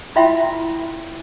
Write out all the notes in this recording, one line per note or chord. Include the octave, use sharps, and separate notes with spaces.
E4 F4 E5 G5 B5 C6